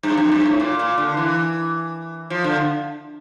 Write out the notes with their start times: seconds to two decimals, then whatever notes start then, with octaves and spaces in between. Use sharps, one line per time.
0.03 G2
0.17 F2
0.32 G2
0.46 A2
0.60 A#2
0.79 A#2
0.98 D3
1.17 E3
2.30 F3
2.44 D3